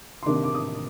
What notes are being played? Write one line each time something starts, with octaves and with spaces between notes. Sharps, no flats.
C6
C3 D#3 A#3 D4 D6
D6
D#6